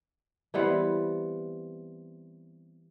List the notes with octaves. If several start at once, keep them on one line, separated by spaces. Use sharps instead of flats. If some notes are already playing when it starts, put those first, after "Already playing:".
E3 G3 B3 C4